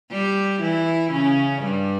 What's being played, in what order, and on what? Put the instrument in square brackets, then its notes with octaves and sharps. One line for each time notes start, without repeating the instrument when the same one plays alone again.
[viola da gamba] G3 G4
E3 E4
C#3 C#4
G2 G3